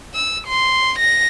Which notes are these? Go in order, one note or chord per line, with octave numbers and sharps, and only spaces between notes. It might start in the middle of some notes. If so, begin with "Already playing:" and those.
E6
C6
A#6